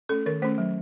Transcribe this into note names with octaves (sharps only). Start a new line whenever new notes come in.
A3 C#4 A4
D#3 A#4
A3 C#4 C5
F#3